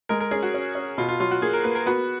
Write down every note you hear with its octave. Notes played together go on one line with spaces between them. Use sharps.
G#3 A#4
A#4
C#4 G#4
F#4
C#4
C#4
B2 F4
F4
F#3 F4
F#4
A#3 G#4
A#4
A#3 B4
A#4
B3 F#4